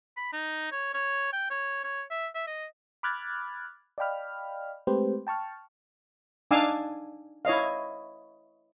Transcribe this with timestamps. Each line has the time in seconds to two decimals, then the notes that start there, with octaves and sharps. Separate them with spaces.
0.17 B5
0.33 D#4
0.72 C#5
0.94 C#5
1.33 G5
1.50 C#5
1.84 C#5
2.11 E5
2.35 E5
2.47 D#5
3.03 B5 D6 F6 F#6 G#6 A6
3.98 D5 D#5 F5 G5 B5 F6
4.87 G#3 A3 C4 G4 B4 C5
5.27 G5 A5 C#6 F6
6.51 D4 D#4 F5 G#5 D6 E6
7.45 E4 C#5 D#5 F5